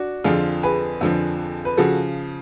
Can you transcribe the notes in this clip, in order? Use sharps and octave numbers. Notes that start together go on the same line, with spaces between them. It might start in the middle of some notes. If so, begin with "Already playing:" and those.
Already playing: D4 F#4
F2 D3 F3 F4 G#4
G#4 B4
F2 D3 F3
B4
C#3 F3 F#4 A4